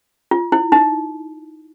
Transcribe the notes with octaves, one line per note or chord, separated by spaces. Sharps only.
F4
E4
D#4